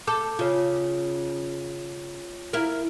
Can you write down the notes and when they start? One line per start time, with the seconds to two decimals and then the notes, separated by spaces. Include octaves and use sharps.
0.07 A4 D6 G6
0.39 C#3 F4 C#5
2.53 E4 A#4